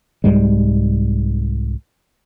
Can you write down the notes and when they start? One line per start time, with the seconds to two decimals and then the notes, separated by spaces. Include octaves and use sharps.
0.24 C2 G#2 G3 G#3